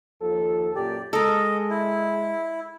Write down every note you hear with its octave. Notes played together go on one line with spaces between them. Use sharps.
D#2 F3 A4
F#2 A#2 G4 D5
G#3 A4 A#4 D#5
E4